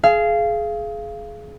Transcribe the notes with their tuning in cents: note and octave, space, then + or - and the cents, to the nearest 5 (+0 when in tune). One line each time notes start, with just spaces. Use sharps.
G#4 +25 F5 -20